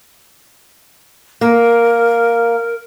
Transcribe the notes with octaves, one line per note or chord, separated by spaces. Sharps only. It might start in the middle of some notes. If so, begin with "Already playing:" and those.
A#3 A#4